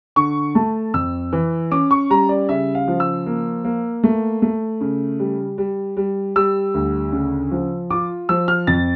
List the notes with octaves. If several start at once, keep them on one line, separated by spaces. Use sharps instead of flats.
D3 C#6
A3 A5
F2 E6
E3
C#4 D6
C#6
G3 A#5
D5
C#3 E5
F5
F3
E6
A#3
A#3
A3
A3
C#3
G3
G3
G3
G3 E6
D2
C#3
F3
F4 D6
F3 E6
F6
F2 A6